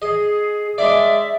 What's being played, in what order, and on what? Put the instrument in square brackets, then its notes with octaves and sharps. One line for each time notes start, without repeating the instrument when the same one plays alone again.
[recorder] G#4 [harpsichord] D#5
[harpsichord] G#3 D4 D5 [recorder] E5